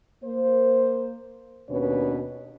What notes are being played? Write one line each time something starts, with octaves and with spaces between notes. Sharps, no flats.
A#3 C5
D#2 B2 C#4 D4 B4 C#5